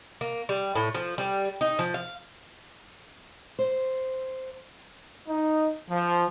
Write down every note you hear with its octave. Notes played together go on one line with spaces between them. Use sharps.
A#3
G3
A2
F3
G3
D#4
F3
F5
C5
D#4
F3